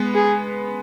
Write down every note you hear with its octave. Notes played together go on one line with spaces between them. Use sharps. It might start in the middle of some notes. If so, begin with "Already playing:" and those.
Already playing: G#3 B3
G#4